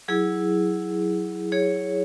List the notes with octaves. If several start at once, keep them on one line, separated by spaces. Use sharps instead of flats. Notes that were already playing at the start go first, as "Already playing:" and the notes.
F#3 E4 G#4
G#4 C#5